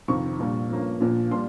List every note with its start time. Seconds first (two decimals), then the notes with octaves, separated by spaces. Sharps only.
0.08 F2 C3 D#3 C#6
0.39 A#1 A#2 G3
0.70 G2 F3 A#3 C#4
1.00 A#1 A#2 F3
1.31 A#2 G3 C6